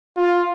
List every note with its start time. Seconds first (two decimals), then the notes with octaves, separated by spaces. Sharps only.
0.17 F4